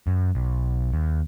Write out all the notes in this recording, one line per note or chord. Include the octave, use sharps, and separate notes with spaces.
F#2
B1
D#2